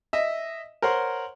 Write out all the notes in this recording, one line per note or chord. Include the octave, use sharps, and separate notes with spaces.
D#5 E5
A#4 C5 C#5 F#5 C6